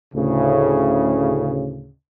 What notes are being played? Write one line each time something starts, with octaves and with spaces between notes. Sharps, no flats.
D2 A2 C#3